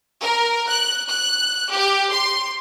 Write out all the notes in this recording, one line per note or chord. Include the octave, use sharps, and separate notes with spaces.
A#4
F#6
F#6
G4
C6